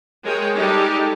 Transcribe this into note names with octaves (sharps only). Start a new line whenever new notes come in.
G#3 A#4 C#5 G5
G3 G#3 D#4 G4 A4